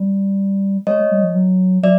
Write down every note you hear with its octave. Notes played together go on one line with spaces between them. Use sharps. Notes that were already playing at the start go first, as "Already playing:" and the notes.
Already playing: G3
G#3 C#5 D#5
A3
G3
F3
F#3
F#3 D5 E5